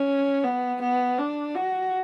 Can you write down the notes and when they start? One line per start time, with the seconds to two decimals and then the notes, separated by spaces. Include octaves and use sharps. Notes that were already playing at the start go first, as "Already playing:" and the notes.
Already playing: C#4
0.44 B3
0.81 B3
1.18 D4
1.55 F#4